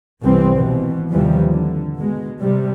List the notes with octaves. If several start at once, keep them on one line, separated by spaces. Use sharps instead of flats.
G1 C2 E3 G3 C4
G#1 B2 E3
D#2 C3 E3 F3 G3
D3
B2 G#3
C3 G3